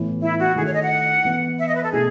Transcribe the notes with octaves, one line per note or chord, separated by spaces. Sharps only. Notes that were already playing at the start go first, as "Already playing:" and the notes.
Already playing: A2 E3 B3
E4
F#4
D#3 A3 E4 G#4
C#5
D#5
F#5
E3 B3 E4
E5
D#5
B4
A4
B2 A3 E4 G#4